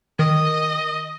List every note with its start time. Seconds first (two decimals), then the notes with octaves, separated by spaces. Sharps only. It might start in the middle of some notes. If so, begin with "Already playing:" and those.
0.19 D#3 D#5